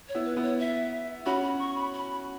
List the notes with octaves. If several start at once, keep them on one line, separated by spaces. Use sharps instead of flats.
C#5
B3 E4
B4
B3 E4
C#5
E5
C#4 F#4 B5
B5
C#6
B5
B5